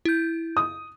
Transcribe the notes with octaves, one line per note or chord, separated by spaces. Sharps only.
E4 G6
D#6